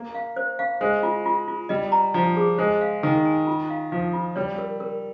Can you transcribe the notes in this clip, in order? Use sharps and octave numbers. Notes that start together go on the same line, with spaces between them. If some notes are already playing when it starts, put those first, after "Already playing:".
Already playing: A#3
F5
C5
F5
G#3 C5
F4
F4
F4
G3 D#5
A#5
F3 A#5
G#4
G#3 C5
F5
D#3 G#5
G#5
F4
F5
F3 F5
F4
G3 C#5
A#4
A#4